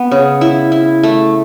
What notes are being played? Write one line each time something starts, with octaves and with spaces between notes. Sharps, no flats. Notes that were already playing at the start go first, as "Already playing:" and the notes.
Already playing: B3
C#3
E4
E4
A3